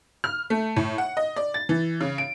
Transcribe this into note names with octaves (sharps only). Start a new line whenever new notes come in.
F6
A3
A2
F#5
D#5
D5
A6
E3
C#3
D7